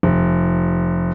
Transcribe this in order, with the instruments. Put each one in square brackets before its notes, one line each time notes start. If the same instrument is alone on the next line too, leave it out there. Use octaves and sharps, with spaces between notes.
[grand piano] F1